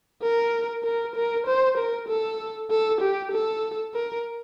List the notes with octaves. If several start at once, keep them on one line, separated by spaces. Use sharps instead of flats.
A#4
A#4
A#4
C5
A#4
A4
A4
G4
A4
A#4